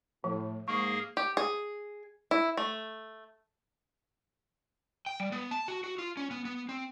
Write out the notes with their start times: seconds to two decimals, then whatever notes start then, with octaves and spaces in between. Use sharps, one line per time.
0.24 A2 F3
0.68 G#2 A#3 G#4 A#4 C#6
1.17 G4
1.37 G#4
2.31 E4
2.57 A3
5.06 G5
5.20 G3
5.32 B3
5.51 A5
5.68 F#4
5.84 F#4
5.99 F4
6.17 C#4
6.31 B3
6.45 B3
6.69 C4